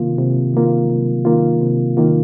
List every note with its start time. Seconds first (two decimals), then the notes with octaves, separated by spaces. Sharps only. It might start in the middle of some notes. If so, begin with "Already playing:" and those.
Already playing: C3 D#3 A#3 F4
0.18 C3
0.54 D#3 A#3 F4
0.89 C3
1.25 D#3 A#3 F4
1.61 C3
1.97 D#3 A#3 F4